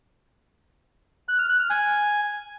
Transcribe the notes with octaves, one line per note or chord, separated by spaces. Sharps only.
F#6
F6
F#6
F6
G#5